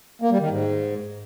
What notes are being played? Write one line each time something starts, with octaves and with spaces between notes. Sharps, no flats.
A#3
G3
D#3
G#2